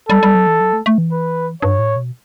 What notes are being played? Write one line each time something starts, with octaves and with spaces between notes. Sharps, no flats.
G3 A4
G3
F#3
E3
F#3
A3
A3
E3
B4
G2 C#5
A2
B2